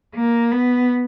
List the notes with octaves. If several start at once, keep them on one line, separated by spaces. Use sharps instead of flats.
A#3
B3